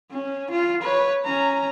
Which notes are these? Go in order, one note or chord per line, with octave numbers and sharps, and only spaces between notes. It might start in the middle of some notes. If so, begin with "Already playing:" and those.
C#4
F4
B4 C#5
C#4 A#5